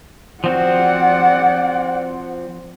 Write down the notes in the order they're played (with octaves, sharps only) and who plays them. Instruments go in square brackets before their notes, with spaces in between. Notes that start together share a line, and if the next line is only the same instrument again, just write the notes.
[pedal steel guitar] F3 C4 F#4 [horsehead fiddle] D5 F#5